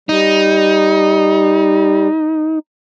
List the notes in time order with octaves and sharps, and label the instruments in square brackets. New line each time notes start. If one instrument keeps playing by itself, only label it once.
[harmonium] G3 [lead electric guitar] D#4